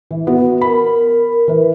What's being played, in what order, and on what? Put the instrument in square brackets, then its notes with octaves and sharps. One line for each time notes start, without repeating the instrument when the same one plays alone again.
[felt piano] E3
B3 F#4
[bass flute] A#4 [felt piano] B5
[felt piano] E3 B4